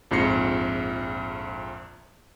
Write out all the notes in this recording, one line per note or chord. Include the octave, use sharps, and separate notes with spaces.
A#1 F2 G#2 A#6 C7 C#7